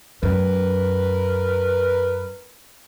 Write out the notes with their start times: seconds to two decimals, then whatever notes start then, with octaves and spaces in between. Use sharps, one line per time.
0.23 F#2 A#4 B4